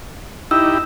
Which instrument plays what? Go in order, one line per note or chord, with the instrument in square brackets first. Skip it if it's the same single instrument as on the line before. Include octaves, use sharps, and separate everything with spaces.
[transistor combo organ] D#4 E4 G4 [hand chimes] E6